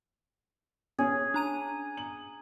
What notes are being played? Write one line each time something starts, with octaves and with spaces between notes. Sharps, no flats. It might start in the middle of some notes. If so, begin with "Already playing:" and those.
C#4 G#4
D4 A#5 D#7
F#7